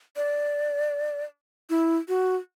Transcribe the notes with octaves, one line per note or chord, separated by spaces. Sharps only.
D5
E4
F#4